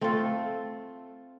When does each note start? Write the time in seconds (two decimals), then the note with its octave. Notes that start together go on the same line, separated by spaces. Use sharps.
0.01 A3 C4 F4 A4